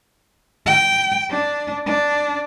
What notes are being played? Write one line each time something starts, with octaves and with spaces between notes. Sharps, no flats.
G5
D4
D4